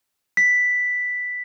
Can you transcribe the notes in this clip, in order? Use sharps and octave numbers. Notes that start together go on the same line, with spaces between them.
B6